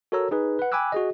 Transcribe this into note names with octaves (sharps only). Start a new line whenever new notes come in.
F#4 A4 A#4 C#5 A#5 E6
D#4 G#4 B4
B4 F#5
G5 G#5 B5 D6 E6 F#6
F#4 G#4 D#5